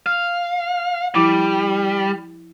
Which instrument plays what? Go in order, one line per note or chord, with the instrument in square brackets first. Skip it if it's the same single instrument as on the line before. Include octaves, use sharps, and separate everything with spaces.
[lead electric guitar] F5
[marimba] F3 E4 D6 [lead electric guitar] G3